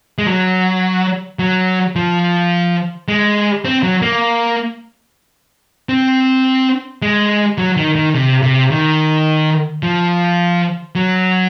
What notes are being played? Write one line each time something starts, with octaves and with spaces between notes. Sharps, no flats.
G#3
F#3
F#3
F3
G#3
C4
F#3
A#3
C4
G#3
F#3
D#3
D#3
C3
C3
D#3
F3
F#3